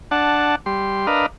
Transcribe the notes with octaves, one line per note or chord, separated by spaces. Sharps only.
D4 F#5 A5
G3 C6
D4 A#4 B4 D#5 F5